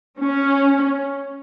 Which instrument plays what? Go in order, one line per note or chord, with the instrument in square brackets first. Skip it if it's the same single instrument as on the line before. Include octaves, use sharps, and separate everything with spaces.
[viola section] C#4